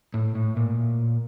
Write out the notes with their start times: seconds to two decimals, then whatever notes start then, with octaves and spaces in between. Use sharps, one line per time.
0.14 A2
0.35 A2
0.57 A#2